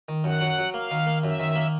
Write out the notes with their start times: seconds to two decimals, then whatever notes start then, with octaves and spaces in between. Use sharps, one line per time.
0.08 D#3
0.24 F#2 F#5
0.41 F#3
0.58 F#3
0.74 A#3 F5
0.91 D#3
1.07 A#3
1.23 F#2 E5
1.40 D#3
1.56 A#3